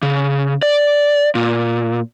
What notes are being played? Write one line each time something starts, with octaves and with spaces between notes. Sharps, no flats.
C#3
D5
A#2